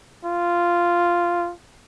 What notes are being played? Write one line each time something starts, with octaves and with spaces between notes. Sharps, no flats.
F4